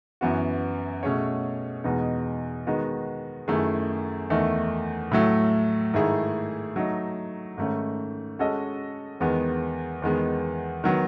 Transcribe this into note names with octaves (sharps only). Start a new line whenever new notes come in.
F#2 E3 B3 F#4
B2 A3 C#4 G#4 C#5
E2 B2 G#3 B3 D#4
D#3 G#3 B3 D#4 F#4
F#2 D#3 A3 E4 G#4
E2 D#3 A3 D#4
A2 F#3 A3
G#2 D#3 A3 E4 G#4
F#3 A3 D#4
G#2 D#3 A3 C#4
G#3 C#4 F#4 A4 D#5
E2 D#3 G#3 B3
E2 D#3 G#3 B3
D#3 F#3 B3